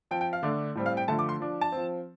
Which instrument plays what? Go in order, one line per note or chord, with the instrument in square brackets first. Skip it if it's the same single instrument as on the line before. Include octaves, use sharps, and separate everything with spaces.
[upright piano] F3 C4 G5
G5
F5
D3 A3 D4
A2 G3 C4
F5
G5
D3 F3 A3 A5
D6
C6
F3 D4
A5
F3 C4